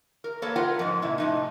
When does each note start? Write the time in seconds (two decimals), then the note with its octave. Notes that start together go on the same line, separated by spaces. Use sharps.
0.24 A#4
0.42 A#3 A4 B4 C#5
0.56 F4 A#4 B4 F#5 G5
0.79 F2 G#2
1.02 A#2 C#3 E4
1.18 A2 C3 D#4